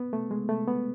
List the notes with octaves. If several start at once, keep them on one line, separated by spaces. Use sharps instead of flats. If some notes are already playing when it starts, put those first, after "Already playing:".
Already playing: B3
A3
G#3
A3
B3